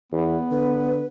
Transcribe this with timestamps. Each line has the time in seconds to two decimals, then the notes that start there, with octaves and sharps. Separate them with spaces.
0.12 E2 B3
0.51 D3 B4